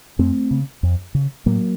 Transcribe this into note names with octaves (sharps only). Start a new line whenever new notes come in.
F2 A3 C4
C#3
F2
C#3
A2 F#3 A#3